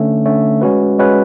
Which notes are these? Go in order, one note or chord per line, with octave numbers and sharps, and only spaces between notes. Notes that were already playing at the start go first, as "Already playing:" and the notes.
Already playing: D3 A3 C#4
D3 A3 C#4
G#3 C#4 F#4 B4
G#3 C#4 F#4 B4